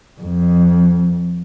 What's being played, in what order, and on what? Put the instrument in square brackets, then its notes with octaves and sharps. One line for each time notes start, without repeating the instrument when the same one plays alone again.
[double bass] F2